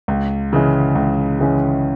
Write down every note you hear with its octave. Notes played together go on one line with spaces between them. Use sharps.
C#2
C#3 E3 G#3 C#4
C#2
C#3 E3 G#3 C#4